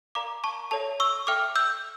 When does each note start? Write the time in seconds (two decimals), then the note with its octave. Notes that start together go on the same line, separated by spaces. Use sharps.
0.15 A#4 D5 F5 A#5 D6
0.44 A5 C#6
0.71 A4 C#5 E5 A5
1.00 C#6 E6
1.27 A4 E5 G5 D6 F6
1.56 E6 G6